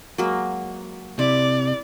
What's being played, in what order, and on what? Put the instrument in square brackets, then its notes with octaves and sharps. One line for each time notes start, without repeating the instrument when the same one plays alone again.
[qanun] F#3 G#3 A#3
[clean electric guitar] C3 [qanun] E4 [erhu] D5